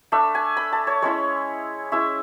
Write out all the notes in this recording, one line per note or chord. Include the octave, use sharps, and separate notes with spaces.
A3 D4 E5
G#5
B5
A5
C#5
G#3 C#4 E4 C#5
G#3 C#4 E4 E5